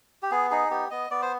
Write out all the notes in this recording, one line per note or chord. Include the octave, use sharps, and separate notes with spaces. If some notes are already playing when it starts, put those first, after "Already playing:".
G4
B3 G#4
D#4 G#4
B3 G4
B3 D#5
B3 D5
C5